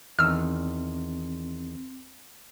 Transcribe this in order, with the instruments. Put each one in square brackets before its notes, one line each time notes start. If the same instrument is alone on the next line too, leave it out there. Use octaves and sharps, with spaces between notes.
[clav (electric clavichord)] E2 D#3 [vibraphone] C4 [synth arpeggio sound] E6 F6